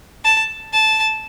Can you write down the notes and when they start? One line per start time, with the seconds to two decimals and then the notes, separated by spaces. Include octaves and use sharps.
0.24 A5
0.73 A5